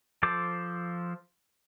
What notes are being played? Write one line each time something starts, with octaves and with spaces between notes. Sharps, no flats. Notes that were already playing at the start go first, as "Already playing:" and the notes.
F3 A4 C5 D6